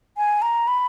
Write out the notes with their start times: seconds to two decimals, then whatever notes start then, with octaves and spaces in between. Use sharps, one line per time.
0.18 G#5
0.42 A#5
0.68 B5